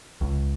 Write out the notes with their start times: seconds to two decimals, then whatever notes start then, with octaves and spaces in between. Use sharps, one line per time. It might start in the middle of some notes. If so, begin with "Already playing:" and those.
0.21 C#2